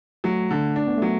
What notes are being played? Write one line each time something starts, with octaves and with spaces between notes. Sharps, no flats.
F#3 A3
D3
D4
B3
F#3 A3